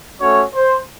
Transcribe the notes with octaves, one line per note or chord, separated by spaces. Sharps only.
A3 C#4 F#4 C#5
C5